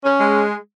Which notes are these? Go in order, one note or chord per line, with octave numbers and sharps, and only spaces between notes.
C#4
G#3